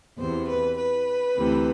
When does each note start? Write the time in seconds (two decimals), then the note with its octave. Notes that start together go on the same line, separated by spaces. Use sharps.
0.18 E2 C3 E3 C5
0.47 B4
0.77 B4
1.35 D2 C3 E3